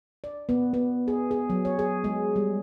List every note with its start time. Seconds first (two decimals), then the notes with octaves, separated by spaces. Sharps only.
0.24 D5
0.49 B3
0.74 B3
1.08 G#4
1.31 G#4
1.50 F#3
1.65 C#5
1.79 G#4
2.04 G#3
2.36 G3